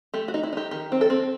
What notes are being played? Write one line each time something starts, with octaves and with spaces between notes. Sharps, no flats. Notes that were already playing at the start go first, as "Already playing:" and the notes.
A3 G4
F#4
D#4
E4
D#4 G4
D#3 G4
C4
A4
C4